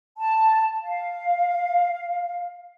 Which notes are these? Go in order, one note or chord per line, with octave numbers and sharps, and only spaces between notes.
A5
F5